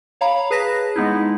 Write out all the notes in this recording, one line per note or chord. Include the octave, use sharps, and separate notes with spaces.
C#5 F5 A#5 B5
G#4 B4 A5 A#6 B6
G#3 B3 D#4 E4